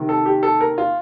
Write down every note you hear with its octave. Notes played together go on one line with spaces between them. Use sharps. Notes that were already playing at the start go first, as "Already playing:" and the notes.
Already playing: C3 D#3
A4
G4
A4
A#4
F4